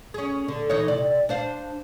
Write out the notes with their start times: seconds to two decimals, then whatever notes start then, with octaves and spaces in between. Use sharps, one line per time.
0.14 C#4 G#4
0.48 D3
0.70 E3 D#4 C#5
0.88 C3 D5
1.29 D4 C5 F5